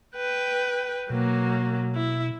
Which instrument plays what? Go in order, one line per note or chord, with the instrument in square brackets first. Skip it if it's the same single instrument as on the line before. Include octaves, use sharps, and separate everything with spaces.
[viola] B4 G5
[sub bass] B2 [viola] F#3 A#3
[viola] E4